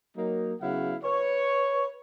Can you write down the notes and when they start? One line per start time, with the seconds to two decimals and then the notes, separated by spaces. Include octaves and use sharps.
0.16 F#3 A#3 D#4
0.61 C#3 F#3 B3 E4 F5 F#5
1.04 B4 C#5